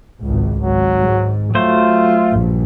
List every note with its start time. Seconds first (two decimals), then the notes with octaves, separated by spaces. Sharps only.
0.22 G#1 C#2
0.61 G#1 F#3
1.00 G#2
1.55 F#3 A3 F4 C5
2.31 A#1 G2